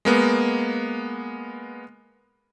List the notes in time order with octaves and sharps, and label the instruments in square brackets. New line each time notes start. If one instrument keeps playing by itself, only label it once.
[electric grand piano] G#3 A#3 B3